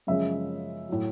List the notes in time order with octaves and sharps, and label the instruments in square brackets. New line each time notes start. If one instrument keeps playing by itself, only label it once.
[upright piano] F#2 C#3 F3 G#3 E5
A2 F#3